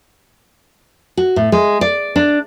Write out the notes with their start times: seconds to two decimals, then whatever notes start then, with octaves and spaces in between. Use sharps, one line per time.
1.17 F#4
1.36 A2
1.52 G#3
1.81 D5
2.16 D4